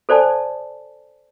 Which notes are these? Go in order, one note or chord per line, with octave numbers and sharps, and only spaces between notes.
A4 C5 D5 G#5 A5